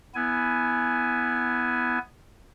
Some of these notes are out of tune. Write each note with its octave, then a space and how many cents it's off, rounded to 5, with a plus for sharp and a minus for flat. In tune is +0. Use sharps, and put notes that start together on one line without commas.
B3 +0 E4 +0 G#5 +10